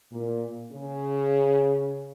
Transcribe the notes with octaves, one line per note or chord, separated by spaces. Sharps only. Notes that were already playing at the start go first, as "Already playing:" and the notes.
A#2
C#3